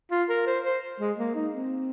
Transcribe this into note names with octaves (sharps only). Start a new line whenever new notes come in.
F4
A#4
C5
C5
G#3
A#3
D#4
C4